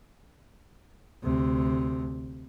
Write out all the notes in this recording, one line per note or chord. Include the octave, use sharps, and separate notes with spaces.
D2 C3